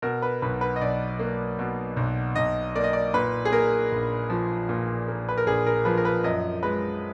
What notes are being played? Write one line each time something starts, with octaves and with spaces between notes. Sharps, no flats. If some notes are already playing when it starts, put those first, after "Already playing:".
B2 A#4
B4
B1 B4
B4
D#5
B1 D5
A#3
B2
B1
B1 D#5
A#3 D5
D#5
D5
A#2 B4
G#4
A#3 A#4
A#1
F3
A#2
A#3
B4
A#4
A#1 G#4
A#4
F3 B4
A#4
B4
F#2 D#5
G#3 B4